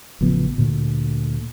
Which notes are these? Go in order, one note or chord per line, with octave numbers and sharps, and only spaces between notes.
A1 C#3 F3 B3
D2 A#2 D3